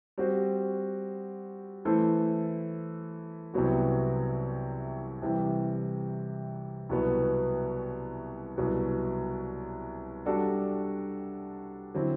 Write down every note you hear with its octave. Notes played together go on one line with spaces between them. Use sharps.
G3 C4 F#4 C5
E3 A3 E4 A4 C5
C2 C3 F#3 B3 F#4
C3 E3 G3
C2 B2 F#3 B3
C2 B2 F#3
G3 D4 F#4 A4 D5
D3 F#3 C4 E4